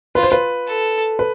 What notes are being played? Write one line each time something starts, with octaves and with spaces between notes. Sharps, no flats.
F4 B4
C5
B4
A4
B4